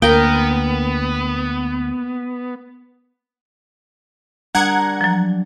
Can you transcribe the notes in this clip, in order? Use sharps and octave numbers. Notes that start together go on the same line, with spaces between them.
D2 A#3 B3 A#4 G5
G3 D4 G#4 A#4 F#5 A#5 G#6
F3 F#3